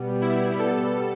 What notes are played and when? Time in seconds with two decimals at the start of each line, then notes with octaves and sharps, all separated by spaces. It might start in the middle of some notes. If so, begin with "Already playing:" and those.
Already playing: B2 G3 B3
0.21 E4
0.59 A4